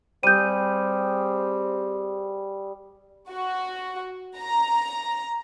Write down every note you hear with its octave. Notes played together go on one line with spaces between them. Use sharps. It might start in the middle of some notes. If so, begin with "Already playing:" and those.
G3 C4 G#4 G6 D#7
F#4
A#5